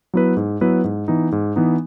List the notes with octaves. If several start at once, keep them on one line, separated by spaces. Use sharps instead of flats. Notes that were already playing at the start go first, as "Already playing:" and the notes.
F#3 B3 E4 B4
G#2
F#3 B3 E4 B4
G#2
E3 B3 D#4
G#2
E3 B3 D#4